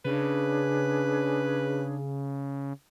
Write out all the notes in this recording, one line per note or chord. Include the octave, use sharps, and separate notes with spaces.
C#3 D4 G#4 B4 C#5